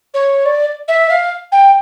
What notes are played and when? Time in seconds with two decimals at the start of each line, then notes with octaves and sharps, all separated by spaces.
0.14 C#5
0.45 D5
0.88 E5
1.09 F5
1.52 G5